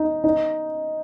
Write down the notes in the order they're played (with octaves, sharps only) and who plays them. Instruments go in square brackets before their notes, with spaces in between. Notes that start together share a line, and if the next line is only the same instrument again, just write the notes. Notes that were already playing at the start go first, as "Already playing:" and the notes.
Already playing: [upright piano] D#4
D#4